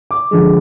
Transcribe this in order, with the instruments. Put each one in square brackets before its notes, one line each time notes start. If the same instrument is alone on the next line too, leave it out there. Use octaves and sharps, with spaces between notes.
[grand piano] D6
D3 F3 G#3